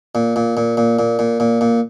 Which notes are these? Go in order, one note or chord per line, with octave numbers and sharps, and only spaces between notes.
A#2
A#2
A#2
A#2
A#2
A#2
A#2
A#2